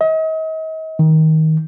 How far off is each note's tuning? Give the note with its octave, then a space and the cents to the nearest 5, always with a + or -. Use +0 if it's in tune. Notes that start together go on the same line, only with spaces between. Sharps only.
D#5 +40
D#3 +20